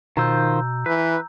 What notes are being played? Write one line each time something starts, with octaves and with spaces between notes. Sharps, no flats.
B2 D#3 F4 C5 A#5 E6 G6
E3 B4